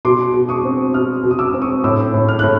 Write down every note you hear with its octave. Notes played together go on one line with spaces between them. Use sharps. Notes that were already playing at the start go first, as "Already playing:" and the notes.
B2 C6 D6
B2
C#6 D#6
C4
B2 D#6 F6
B2
D#6
D6 E6
C4
C#6 D#6
A2 D6 E6
A2
F6
A2 F#6